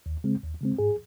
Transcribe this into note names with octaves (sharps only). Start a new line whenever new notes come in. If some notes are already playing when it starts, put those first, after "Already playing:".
D#2
C#3 G#3 C4
D#2
C#3 G#3 C4
G#2 G#4